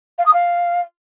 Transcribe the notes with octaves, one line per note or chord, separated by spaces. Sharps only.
F5
D#6
F5